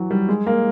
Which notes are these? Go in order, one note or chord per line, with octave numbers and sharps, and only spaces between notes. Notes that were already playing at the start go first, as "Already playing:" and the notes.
Already playing: E3 F#3
G3
G#3
A#3